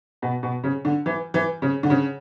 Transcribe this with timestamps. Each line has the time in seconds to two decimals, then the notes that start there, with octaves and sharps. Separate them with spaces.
0.22 B2
0.43 B2
0.64 C#3
0.85 D3
1.06 E3
1.34 E3
1.62 C#3
1.83 D3
1.90 C#3